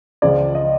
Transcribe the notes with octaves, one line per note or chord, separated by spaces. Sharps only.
C#2 C#3 F3 D5
D#5